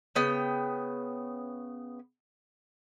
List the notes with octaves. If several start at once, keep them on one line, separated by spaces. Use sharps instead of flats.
C#3 B3 G5